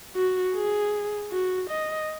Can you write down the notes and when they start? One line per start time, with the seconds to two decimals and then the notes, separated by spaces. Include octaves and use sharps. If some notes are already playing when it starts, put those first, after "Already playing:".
0.16 F#4
0.55 G#4
1.32 F#4
1.70 D#5